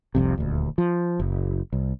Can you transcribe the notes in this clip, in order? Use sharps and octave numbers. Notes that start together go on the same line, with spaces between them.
F1 C2 F2 C3
D#1 D2
F3
F#1
C2